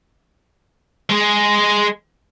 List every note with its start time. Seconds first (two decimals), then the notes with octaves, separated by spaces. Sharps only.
1.10 G#3 G#4